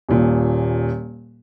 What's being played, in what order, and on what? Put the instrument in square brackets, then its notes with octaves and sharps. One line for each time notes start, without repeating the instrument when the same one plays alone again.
[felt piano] D#1 A#2